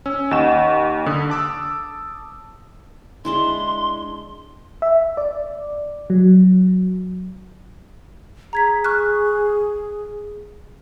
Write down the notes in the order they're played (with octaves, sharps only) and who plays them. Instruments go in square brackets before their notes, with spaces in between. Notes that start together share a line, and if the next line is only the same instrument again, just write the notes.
[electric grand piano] C#4 [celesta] E6
[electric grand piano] D#2 E7 [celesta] D#5 F#5 C#6
[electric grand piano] D3 [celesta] D#6
[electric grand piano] A5 D6 E6
[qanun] G#3 D4 E4 [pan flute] C6
[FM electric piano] E5
D5
F#3
[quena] G#4 [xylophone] A#5 G#6 B6
[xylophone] C#6 F6 F#6